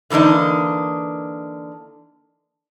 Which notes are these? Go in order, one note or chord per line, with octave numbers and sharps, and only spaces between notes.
D3 E3 A#3 D4 D#4